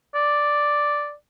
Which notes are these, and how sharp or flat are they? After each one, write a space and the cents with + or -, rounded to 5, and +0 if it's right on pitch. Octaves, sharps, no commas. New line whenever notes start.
D5 +0